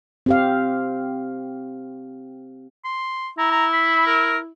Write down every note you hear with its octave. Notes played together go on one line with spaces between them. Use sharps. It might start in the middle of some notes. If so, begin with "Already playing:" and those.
C4 G4 F5
C6
E4 A#5
A#5
B5
A#4